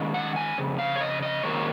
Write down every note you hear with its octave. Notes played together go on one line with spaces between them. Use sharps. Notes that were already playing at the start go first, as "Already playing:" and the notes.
Already playing: D#3 G#3 C#4
F#5
G#5
F2 C#3
F5
C#5
D#5
D#5
G#2 D#3 F#3 A#3 C#4 C#5